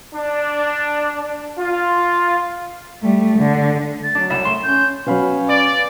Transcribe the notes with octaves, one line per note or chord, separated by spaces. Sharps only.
D4
F4
G3 A3
D3
A6
F#3 D4
C2 E7
A3 C6
C#4 G6
B2 F#3 C#4 B4 F5 B5
D5 D6